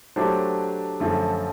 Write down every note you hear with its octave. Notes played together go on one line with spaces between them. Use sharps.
F#3 A3 D4 G4 C5
F#2 D3 F3 A3